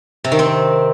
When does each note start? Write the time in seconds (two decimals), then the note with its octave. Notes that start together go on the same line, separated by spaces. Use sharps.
0.24 C3
0.32 D#3
0.39 C4